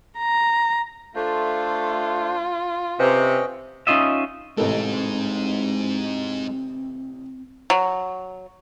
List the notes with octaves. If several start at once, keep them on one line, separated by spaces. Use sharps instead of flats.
A#5
A3 D4 F4 C5
C3 C#4 B4 C5 D#5 G5 G#5
C#4 D#4 F4 D#5 E5
A1 C3 G#3 C4 D#4 A4
F#3